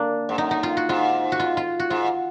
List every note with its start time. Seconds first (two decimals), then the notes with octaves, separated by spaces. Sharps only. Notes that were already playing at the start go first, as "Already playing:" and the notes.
Already playing: A#3 D4
0.29 G#2
0.38 F#2 D#4
0.51 D#4
0.63 F4
0.77 F#4
0.89 G#2 F4
1.32 F#4
1.39 F4
1.57 F4
1.79 F#4
1.90 G#2 F4